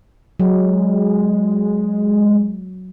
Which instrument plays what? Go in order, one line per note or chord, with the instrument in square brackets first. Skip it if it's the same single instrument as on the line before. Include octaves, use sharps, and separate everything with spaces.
[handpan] F#3 [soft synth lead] G#3